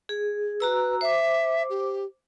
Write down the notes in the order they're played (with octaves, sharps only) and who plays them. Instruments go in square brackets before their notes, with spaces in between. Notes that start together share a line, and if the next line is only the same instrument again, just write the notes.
[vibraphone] G#4
[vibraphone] F#4 A#5 E6 [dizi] B4
[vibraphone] C5 D6 [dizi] E5
[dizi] G4